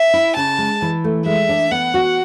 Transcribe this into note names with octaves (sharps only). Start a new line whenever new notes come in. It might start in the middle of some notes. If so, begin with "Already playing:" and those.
Already playing: E5
E4
C#3 A5
G#3
E3
A3
G#3 E5
D4
B3 F#5
F#4